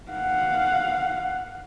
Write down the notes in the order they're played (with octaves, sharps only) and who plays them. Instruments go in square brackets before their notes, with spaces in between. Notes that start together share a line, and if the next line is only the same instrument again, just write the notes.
[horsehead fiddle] F5 F#5